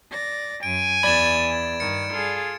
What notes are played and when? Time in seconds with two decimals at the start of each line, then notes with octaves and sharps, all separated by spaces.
0.10 D5 A#6
0.63 F#2 G#5 D7
1.03 E2 D5 B5 G#6 A6 E7
1.80 G2 D#3 C#7
2.12 F4 G#4 A4 F5